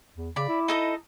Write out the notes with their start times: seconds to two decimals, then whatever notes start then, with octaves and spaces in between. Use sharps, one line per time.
0.16 E2
0.36 C#3 D5 B5
0.49 E4
0.68 D#4 A4 D#5